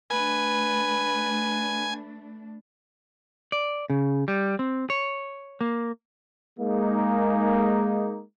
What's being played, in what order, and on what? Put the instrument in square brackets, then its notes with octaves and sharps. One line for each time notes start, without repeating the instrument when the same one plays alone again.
[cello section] A3 D4 [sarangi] B4 [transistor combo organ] G#5
[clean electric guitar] D5
C#3
G3
C4
C#5
A#3
[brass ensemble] G#3 A#3 D#4